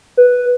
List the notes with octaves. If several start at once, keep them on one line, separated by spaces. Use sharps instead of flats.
B4